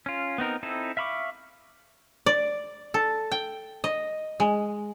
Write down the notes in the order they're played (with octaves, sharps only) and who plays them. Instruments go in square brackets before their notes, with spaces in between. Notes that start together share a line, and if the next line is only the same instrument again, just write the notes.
[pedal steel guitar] C#4 F4
B3 C4 D#4 A#4
C4 D#4 E4 A4
E5 F5 B5 C#6 D6
[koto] D5
A4
G5
D#5
G#3